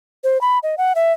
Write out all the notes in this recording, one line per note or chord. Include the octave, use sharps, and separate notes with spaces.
C5
B5
D#5
F#5
E5